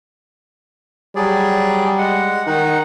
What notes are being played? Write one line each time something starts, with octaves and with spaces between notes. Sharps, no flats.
F#3 G3 G#4 D5
G#3 F#5
D#3 D#4 F#5